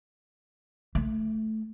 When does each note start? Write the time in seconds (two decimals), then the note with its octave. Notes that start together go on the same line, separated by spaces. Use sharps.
0.95 A3